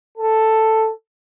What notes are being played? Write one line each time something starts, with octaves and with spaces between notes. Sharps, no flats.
A4